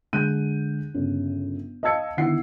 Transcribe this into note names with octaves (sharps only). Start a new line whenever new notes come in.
D3 G#3 F#6 G6 D#7
G1 C#3
D#5 F5 A5 E6 G#6 C#7
D3 D#3 B3 E4 F#5 C7